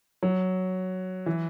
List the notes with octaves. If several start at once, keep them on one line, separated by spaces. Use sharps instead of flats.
F#3
E3